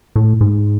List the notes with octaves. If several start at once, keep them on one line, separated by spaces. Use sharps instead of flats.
A2
G#2